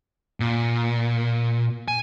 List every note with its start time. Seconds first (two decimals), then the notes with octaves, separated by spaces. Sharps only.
0.40 A#2
1.88 G#5